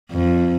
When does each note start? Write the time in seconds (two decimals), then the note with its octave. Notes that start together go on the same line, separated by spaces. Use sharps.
0.11 F2